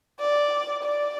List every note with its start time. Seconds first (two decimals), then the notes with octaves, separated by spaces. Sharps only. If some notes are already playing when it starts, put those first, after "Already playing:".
0.20 D5
0.83 D5